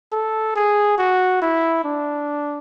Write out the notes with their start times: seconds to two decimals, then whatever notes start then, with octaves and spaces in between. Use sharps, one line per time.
0.12 A4
0.56 G#4
0.98 F#4
1.42 E4
1.85 D4